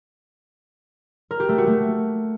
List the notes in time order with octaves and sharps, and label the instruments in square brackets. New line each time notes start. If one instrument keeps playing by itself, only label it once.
[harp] A#4
G4
A3
F#4
A3